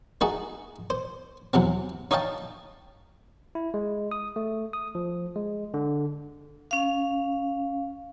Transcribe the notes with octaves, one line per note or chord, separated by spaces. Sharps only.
A3 D#4 F#4 G#4
C5
E2 C3 F#3 C4
D#4 C#5 D#5 F5 G5 A5
E4
G#3
D#6
A3
D#6
F3
G#3
D3
C#4 F5